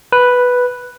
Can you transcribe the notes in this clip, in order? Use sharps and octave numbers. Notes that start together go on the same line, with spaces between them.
B4